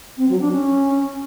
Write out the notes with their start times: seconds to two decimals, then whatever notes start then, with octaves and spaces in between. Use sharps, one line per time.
0.17 C4
0.29 F#3
0.40 D4
0.52 C#4